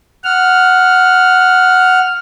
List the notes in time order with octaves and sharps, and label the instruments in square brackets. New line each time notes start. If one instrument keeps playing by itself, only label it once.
[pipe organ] F#5 F6